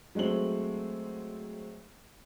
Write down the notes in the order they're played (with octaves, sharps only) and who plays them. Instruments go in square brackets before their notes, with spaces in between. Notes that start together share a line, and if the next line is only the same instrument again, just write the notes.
[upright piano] F#3 G#3 A3 C4 F#7